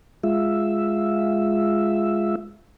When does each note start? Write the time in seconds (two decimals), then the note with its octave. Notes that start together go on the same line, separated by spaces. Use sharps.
0.23 G#3 F4 E5